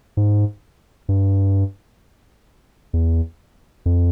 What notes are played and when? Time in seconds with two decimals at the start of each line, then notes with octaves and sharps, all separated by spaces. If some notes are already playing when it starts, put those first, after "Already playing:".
0.17 G#2
1.09 G2
2.93 E2
3.86 F2